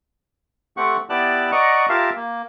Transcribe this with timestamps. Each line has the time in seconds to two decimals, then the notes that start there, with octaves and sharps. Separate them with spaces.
0.77 A3 C4 G4 F#5 C#6
1.10 B3 E4 G4 D5 A5 F#6
1.52 D5 D#5 F#5 A#5 C#6
1.89 F4 G4 A#4 E5 F5 A5
2.16 A#3